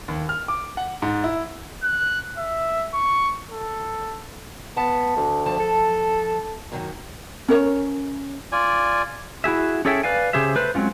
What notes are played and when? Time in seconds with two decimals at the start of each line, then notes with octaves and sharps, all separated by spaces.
0.08 D#2
0.29 F6
0.48 D6
0.77 F#5
1.02 G#2
1.24 E4
1.84 F#6
2.38 E5
2.94 C#6
3.51 A4
4.77 B3 A5
5.17 D2
5.46 F3 A5
5.59 A4
6.72 F#2 D#3 F#3
7.48 C#4 A#4 C#5
8.52 F4 D5 G#5
9.44 E4 F#4 G#4 E5
9.85 C#4 G#4 A4 C#5 E5 G5
10.03 B4 D5 F5 G#5
10.33 C#3 G4 G#4 C5 E5
10.55 A3 B4 C5
10.75 F#3 G#3 C4 C#4 F4